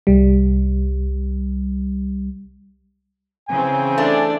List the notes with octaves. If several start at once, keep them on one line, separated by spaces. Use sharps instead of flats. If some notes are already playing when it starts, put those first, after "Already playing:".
C2 G3
C#3 E3 C4 G#5
A3 D4 D5